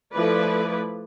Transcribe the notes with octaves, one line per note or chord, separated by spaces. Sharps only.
F3 A3 E4 B4 D5